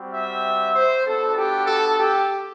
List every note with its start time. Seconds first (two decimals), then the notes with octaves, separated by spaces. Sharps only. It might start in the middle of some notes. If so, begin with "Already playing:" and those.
Already playing: G3 C4 F#4
0.13 E5
0.74 C5
1.05 B3 D4 F#4 A4
1.36 G4
1.67 A4
1.97 G4